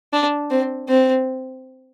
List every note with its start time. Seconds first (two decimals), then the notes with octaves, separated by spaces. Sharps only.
0.13 D4
0.50 C4
0.89 C4